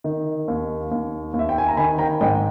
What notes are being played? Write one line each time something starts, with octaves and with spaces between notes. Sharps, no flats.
D#3
D#2
D#2
D#2
E5
G5
G#5
A#5
D#3 G#5 B5
G5 A#5
G#2 D#5 G5